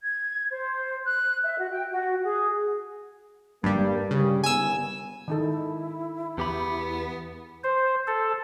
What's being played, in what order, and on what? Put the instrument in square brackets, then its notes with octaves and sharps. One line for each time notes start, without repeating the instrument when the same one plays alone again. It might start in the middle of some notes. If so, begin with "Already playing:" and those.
[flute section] G#6
C5
F#6
E5
F#4
G5
F#4
G#4
[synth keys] G2 G3 [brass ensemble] A#3
[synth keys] C#3 [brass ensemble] G3
[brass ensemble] G1 D#3 B3 [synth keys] G#5 E6
[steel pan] D#3 D#4 A4 [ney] E4
[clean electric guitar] E2 G4 B5 [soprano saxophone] B3
[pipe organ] C5
A4